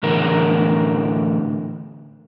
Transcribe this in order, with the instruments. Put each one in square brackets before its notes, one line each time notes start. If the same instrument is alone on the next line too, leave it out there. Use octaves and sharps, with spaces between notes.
[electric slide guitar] A2 D3 E3 A#4